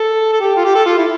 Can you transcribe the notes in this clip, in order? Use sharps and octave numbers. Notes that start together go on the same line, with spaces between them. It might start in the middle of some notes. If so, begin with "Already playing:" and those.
Already playing: A4
A4
G4
F4
G4
A4
F4
E4